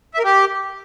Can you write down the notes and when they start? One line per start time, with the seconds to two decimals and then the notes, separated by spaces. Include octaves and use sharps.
0.14 E5
0.19 A#4
0.24 G4